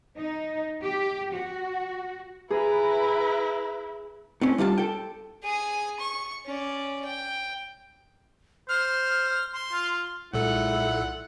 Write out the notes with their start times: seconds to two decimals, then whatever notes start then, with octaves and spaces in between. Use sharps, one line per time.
0.19 D#4
0.82 G4
1.33 F#4
2.51 E4 G#4 B4 A#5
4.41 A2 C4 C#4
4.58 G3 D4 F4 A5
4.78 A4 G5
5.43 G#4 G#5
6.00 C#6
6.45 C#4 D5
7.05 G5
8.69 C5 F6
9.53 C6
9.73 F4
10.34 B1 A#2 G#3 E4 A4 F#5